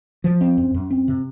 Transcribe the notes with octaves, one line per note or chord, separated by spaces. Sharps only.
F3
C4
F#2
F#2
C4
C3